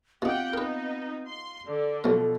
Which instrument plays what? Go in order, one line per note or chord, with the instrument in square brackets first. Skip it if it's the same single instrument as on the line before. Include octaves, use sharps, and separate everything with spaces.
[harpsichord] B2 D#4 [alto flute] C4 [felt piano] F4 [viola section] G4 F#5 G5
[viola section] B3 D#4 [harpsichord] A#4 B4
[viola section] C6
[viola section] D3 [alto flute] D5
[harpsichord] B1 A#4 [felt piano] B2 F3 [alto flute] A4